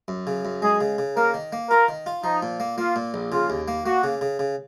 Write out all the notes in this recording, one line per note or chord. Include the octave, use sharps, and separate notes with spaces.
F#2
C#3
F#2
G#3 G#4
C#3
C#3
A#3 A#4
D#3
A#3
F4 A#4
D#3
F4
F3 D#4
A#2
A#3
A#3 F4
A#2
A#1
C#3 F4
D#2
A#3
A#3 F#4
C#3
C#3
C#3